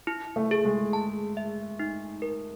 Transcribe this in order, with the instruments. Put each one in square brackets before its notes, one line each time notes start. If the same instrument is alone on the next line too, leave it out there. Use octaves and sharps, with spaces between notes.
[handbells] E4
[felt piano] A3
[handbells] G#4
[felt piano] G#3
[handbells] A5
E5
D#4
A#4